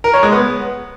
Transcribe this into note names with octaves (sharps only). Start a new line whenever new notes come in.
A#4
C#5
G#3
B3